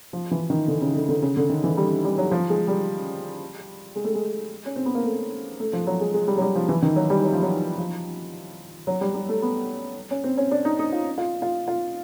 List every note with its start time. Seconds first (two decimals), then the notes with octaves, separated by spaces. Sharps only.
0.13 F3
0.31 E3
0.50 D#3
0.68 D3
0.82 C#3
0.95 D3
1.09 D3
1.22 C#3
1.37 D3
1.50 D#3
1.64 E3
1.77 G3
2.05 G3
2.18 F#3
2.31 F3
2.50 G#3
2.68 G3
3.96 G#3
4.04 A3
4.15 G#3
4.66 C#4
4.76 C4
4.86 B3
4.95 A#3
5.05 A3
5.60 A3
5.73 F3
5.87 F#3
6.01 G#3
6.14 G#3
6.28 G3
6.38 F#3
6.41 G3
6.55 F3
6.69 E3
6.83 D#3
6.96 F#3
7.10 G3
7.24 F#3
7.33 F3
7.43 F#3
7.78 F3
8.87 F#3
9.01 G3
9.15 G3
9.29 A3
9.42 B3
10.11 C#4
10.24 C4
10.37 C#4
10.51 D4
10.65 D#4
10.79 D#4
10.92 F4
11.18 F4
11.42 F4
11.68 F4